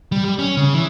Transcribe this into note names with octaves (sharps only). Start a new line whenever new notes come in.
G3
G3
C#4
C#3
E3